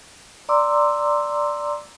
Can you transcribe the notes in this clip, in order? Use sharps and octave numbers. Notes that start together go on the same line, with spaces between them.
D5 A#5 C6 D6 E6